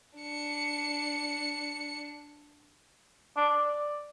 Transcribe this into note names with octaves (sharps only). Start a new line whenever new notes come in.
D4 C#7
D4
D5